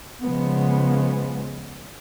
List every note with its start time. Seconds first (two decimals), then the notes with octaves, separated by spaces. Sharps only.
0.22 C#3 F3 G#3 B3